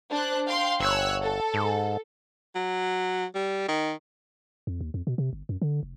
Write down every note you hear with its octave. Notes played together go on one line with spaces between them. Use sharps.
D4 C5 F#6
F5 G5 C6
G1 C#5 E6 F#6
A4
G#2
F#3
G3
D#3
F2
D#2
F2
B2
C3
G1
F#2
D3
F1